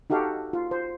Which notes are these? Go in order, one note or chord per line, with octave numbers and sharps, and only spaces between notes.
D#4 F#4 G4 A4 F5
F4
C5